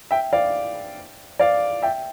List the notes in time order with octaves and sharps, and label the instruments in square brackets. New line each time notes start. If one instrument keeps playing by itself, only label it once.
[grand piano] E5 G5
D5 F5
D5 F5
E5 G5